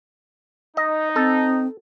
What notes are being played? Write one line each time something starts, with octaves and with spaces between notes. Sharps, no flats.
D#4 D#5
C4 A4